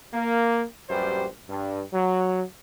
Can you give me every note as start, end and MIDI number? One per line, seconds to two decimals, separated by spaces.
0.14 0.62 58
0.90 1.27 34
0.90 1.27 42
0.90 1.27 55
0.90 1.27 67
0.90 1.27 71
0.90 1.27 72
1.49 1.82 43
1.93 2.42 54